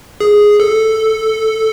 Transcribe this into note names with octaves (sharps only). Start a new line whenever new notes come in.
G#4
A4